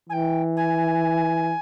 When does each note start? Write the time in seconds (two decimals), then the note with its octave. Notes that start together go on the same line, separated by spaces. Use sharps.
0.09 E3 G#5
0.13 G5
0.57 G#5